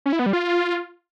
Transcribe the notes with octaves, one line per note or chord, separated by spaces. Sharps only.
C#4
E4
B3
G3
F4